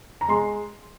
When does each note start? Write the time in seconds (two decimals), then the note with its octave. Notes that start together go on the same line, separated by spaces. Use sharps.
0.21 A#5
0.28 G#3 C6